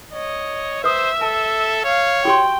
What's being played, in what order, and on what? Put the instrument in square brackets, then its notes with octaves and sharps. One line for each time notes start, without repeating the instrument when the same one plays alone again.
[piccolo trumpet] C#5 [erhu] D#5
[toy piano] B4 D#6 [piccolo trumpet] C5 [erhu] E5
[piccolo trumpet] A4 [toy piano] A5
[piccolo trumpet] C#5 [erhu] F5
[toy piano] F#4 G4 C6 [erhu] G5